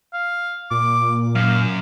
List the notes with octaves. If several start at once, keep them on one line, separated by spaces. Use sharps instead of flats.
F5
A#2 D6
F#2 F5